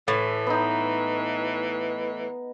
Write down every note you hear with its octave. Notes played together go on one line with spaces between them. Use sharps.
A2 E3
B3 D#4